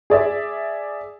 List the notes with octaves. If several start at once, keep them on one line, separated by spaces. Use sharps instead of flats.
G#4 D5 E5